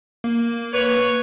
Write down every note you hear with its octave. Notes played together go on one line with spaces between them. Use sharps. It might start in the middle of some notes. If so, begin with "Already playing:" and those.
A#3
B4 C#5